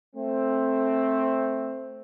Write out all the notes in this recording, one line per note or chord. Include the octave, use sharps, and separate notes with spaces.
A3 C4